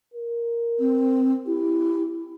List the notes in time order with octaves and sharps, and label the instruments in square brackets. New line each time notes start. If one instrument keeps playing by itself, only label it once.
[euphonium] A#4
[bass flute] C4
[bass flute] E4 [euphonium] G4